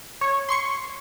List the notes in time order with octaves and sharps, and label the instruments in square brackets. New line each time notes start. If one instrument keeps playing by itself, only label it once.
[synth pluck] C#5
C6 C#6 C#7